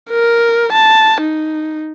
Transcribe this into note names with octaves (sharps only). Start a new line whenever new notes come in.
A#4
A5
D#4